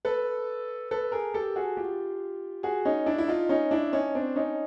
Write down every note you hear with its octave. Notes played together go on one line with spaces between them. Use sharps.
A4 B4
A4 B4
G#4 A#4
G4 A4
F#4 G#4
F4 G4
F#4 G#4
C#4 D#4
D4 E4
E4
D#4 F4
C#4 D#4
D4 E4
C#4 D#4
C4 D4
C#4 D#4